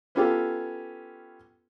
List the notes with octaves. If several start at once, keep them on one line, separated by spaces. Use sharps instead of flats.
B3 C#4 F4 G4 A4